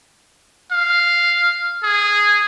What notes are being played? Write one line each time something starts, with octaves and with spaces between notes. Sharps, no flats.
F5
G#4